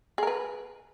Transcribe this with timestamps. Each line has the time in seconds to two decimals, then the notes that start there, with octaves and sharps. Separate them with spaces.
0.18 G#4
0.23 A#4
0.27 B4